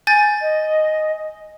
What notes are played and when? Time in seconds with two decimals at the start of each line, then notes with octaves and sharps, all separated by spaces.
0.07 G#5 G6 A6
0.41 D#5